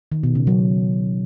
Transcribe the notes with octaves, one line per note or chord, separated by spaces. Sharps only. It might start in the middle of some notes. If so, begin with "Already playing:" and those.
D#3
B2
C#3
F#3